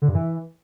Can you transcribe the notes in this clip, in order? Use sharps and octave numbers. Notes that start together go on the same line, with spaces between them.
D3
G2
E3